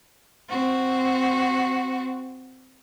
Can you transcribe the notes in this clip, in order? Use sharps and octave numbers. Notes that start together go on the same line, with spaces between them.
C4 F#4